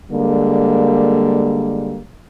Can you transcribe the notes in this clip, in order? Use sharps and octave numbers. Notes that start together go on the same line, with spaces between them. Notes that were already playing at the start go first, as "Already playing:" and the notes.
D3 G3 G#3 A#3